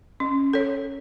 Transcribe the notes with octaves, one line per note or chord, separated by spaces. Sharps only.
C#4
A4 C#5